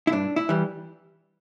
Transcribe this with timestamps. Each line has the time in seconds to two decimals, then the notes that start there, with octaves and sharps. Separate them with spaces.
0.07 E4
0.12 G2 D4
0.36 E4
0.49 E3 G3